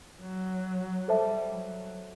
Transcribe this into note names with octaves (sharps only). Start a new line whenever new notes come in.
F#3
G3 A4 C5 E5 A5
F#3